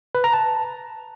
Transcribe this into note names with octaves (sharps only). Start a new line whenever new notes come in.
B4
A#5
A5